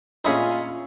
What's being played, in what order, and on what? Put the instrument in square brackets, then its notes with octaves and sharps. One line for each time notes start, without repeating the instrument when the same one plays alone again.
[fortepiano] A#2 C#4 G#4 [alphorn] F4 [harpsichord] D#5 E5 B5